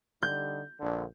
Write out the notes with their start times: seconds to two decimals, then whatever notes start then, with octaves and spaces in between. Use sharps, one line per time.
0.23 D3 G3 D#4 G6
0.80 A#1 D3